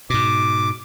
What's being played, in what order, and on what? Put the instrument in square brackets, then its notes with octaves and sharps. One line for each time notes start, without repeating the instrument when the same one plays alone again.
[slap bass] G#2 B2 [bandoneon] D6